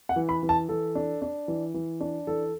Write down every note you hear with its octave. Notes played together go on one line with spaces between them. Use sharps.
F#5
E3
B5
E3
A5
E3 A4
D4
D4
E3
E3
D4
E3 A4